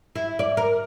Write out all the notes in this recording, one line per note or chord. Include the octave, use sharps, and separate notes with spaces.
E4
D5
A#4